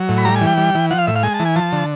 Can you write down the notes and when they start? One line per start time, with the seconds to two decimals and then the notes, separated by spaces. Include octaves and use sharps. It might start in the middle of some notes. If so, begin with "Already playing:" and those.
Already playing: F#3
0.09 A2
0.18 B5
0.25 G3 A#5
0.36 G#5
0.41 E3
0.47 G5
0.58 G3
0.75 E3
0.91 F3 F#5
0.98 F5
1.07 A2 E5
1.16 F5
1.23 G#3 G#5
1.34 A5
1.40 E3
1.45 G#5
1.56 F3 A5
1.72 D3